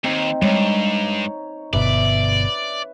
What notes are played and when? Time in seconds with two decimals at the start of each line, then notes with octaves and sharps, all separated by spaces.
0.04 D#2 C4 D#4
0.42 G2 G3 G#3 C#5 A#5
1.73 G1 B2 B4 D5 E5 B5